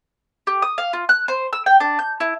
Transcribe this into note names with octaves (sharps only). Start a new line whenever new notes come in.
G4
D#6
F5
F4
F#6
C5
E6
G5
D4
G6
E4